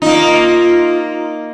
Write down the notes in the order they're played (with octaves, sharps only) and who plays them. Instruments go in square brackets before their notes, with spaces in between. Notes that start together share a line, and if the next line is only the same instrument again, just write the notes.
[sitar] A#3 D#4 [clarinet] F4